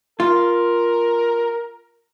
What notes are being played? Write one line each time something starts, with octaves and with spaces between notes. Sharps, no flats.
F4 A#4